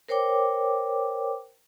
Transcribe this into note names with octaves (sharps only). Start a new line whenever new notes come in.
A#4 C5 C#5 G5 D6